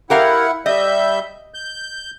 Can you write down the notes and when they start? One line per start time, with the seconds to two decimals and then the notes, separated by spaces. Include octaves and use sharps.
0.10 E4 G4 A#4 F5 F#5
0.66 G3 D#5 E5 G6
1.54 G6